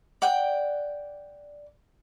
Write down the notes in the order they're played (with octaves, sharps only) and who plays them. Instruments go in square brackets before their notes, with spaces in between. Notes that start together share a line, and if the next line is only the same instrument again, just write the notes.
[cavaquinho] D5 F#5 G5